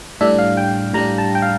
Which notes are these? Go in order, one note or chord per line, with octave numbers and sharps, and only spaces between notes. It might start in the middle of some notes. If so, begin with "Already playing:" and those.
A2 G3 D4 E5
F5
G5
A2 G3 D4 A#5
A5
G5
F5